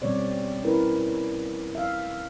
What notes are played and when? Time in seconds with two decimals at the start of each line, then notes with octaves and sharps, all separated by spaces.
0.02 B2 G3 C4 C#4 C#5 D5
0.64 C#4 E4 A#4 B4
1.75 E5 F5